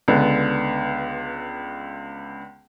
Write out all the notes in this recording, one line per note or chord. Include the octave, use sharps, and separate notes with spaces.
C#2 D3 B3